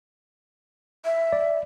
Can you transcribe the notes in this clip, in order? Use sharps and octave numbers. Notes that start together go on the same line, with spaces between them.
E5
D5